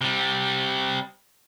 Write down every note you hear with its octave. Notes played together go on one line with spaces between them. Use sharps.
C3 G3